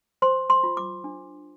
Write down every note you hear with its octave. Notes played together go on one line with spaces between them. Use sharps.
C5 C6
C6
F4
D6
D4